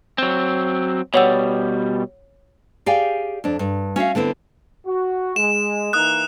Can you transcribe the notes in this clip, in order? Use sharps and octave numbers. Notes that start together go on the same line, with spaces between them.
F#3 C4
B2 G3 C#5 F#5 E6
G4 G#4 D5 F5 G5 G#5
F2 D4
G2
C#4 F#4 E5 F5
D3 B3 C4 E4
F#4
G#3 E7
E3 A#3 D#4 D#6 F#6